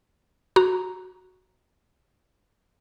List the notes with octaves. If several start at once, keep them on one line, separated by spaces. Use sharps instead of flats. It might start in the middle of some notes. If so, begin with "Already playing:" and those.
F#4 A#5